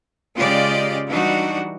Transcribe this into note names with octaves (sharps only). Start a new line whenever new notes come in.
C#3 G#3 F4 G4 D5 D#5
E3 G3 D4 D#4 F#4